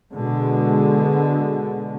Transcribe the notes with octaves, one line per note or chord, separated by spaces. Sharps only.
B2 D3 G#3